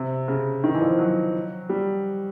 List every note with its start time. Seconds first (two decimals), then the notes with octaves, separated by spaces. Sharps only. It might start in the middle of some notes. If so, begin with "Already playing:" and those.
Already playing: C3
0.28 C#3
0.64 D#3
0.74 E3
0.82 F3
0.99 F#3
1.69 G3